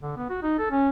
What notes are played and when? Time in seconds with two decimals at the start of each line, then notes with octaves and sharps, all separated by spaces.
0.02 D3
0.17 B3
0.30 F#4
0.43 D#4
0.59 A4
0.71 C#4